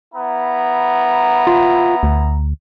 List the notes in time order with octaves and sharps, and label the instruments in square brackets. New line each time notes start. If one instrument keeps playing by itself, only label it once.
[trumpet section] B3 E4 A#5
[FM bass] F4
D2